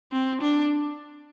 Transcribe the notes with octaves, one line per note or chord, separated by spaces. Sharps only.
C4
D4